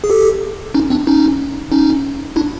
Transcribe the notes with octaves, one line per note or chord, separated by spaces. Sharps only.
G#4
G4 A4
C#4 D#4
C4 D4
C#4 D#4
C#4 D#4
D4 E4